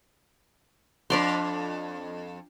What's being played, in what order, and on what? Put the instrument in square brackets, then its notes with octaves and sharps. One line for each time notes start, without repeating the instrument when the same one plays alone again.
[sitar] F2 [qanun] D4 D5 C6